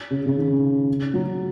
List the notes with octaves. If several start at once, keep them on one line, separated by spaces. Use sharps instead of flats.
C#3
C#3
D#3
F#3